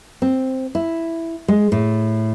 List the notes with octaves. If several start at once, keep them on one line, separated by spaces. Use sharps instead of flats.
C4
E4
G#3
A2